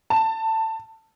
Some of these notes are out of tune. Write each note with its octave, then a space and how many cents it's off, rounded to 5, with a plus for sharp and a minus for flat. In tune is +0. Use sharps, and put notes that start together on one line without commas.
A5 +20